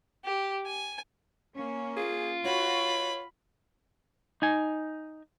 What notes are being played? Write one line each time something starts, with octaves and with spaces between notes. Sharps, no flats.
G4
G#5
A#3 C#4
F4 G#4
F#4 C#5 B5
D#4 G#5